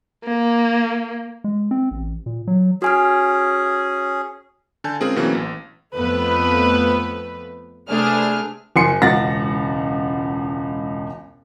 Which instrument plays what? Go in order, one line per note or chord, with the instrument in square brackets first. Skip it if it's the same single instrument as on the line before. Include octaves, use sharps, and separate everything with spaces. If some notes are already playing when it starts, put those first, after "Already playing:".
[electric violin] A#3
[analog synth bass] G#3
C4
A1
A#2
F#3
[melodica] C#4 G#4 [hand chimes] F#4 G#5 F6
[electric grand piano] D3 G#5 A5 G6
G#3 C4 C#4 F4 G#4 A#4
B2 E3 F#3 A#3 C4 C#4
A1
[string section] F2 A3 B3 B4
C3 A3 D4 G#4 B4 F6
[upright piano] F#1 G#5 C6 C#7
E1 C#2 F#5 A6 A#6